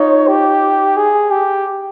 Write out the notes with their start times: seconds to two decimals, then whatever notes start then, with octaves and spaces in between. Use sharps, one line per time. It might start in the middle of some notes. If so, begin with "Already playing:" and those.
Already playing: D#4 F4 C#5
0.28 G4
0.97 G#4
1.31 G4